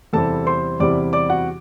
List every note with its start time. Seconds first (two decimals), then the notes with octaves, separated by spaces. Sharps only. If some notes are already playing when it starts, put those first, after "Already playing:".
0.13 E2 C3 G3 C4 E4 A4 A5
0.46 C5 C6
0.80 E2 C3 G3 C4 E4 D5 D6
1.13 D5 D6
1.30 F#4 F#5